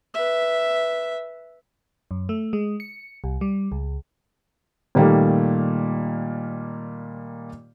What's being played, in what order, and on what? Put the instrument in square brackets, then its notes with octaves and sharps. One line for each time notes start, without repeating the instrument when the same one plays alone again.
[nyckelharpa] B4 E5
[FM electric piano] F#2
A3
G#3
C#7
C2
G3
C#2
[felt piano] A#2 D#3 G3 A3 A#3